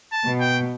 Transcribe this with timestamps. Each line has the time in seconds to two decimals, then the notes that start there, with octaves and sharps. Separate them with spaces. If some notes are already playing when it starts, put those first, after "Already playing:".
0.12 A5
0.26 B2
0.40 G5